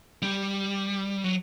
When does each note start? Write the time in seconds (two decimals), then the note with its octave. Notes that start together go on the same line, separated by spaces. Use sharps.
0.22 G3
1.24 F#3